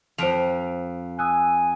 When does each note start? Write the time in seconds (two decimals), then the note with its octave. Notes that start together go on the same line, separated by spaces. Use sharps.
0.18 F2 C5 D7 F7
1.19 G#5 D#6 E6 F#6